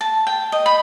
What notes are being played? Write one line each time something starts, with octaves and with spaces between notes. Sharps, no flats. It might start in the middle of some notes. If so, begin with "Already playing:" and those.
A5
G5
D#5
B5